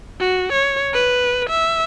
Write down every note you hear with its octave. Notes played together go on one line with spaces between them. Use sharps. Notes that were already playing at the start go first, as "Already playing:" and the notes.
F#4
C#5
B4
E5